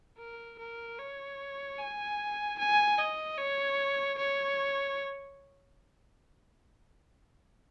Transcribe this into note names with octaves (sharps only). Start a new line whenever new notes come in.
A#4
A#4
C#5
G#5
G#5
D#5
C#5
C#5